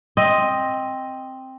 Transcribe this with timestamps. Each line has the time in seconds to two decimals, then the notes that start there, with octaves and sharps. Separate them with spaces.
0.17 C4 D#5